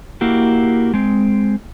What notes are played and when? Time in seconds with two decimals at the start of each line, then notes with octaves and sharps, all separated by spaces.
0.21 A#3 E4 F#4 G4
0.94 G#3 C4